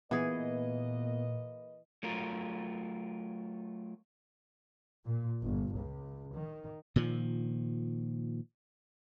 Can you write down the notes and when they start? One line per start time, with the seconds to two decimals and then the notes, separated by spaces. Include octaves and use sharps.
0.11 A#2 E3 A#3 B3 G#4 B4 D#5
2.03 F#3 A3 F4 A#4
5.06 A#2
5.43 G1
5.77 C#2
6.34 D#3
6.96 A#2 D#3 F3